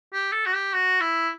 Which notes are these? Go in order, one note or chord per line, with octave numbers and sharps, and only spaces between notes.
G4
A4
F#4
G4
F#4
E4